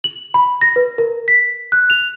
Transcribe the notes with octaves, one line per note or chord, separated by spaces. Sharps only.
F#7
B5
A#6
B4
A#4
B6
F#6
F7